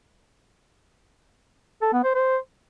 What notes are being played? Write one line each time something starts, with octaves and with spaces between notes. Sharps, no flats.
A4
B3
C5
C5